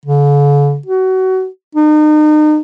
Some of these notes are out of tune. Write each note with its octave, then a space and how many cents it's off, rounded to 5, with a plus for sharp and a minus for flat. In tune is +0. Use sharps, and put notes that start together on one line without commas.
D3 -45
F#4 +25
D#4 -35